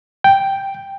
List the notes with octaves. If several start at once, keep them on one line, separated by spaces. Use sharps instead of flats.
G5